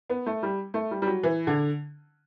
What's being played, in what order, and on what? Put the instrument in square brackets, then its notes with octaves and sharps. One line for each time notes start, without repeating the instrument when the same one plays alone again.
[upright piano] B3
A3
G3
A3
G3
G3
F#3
E3
D3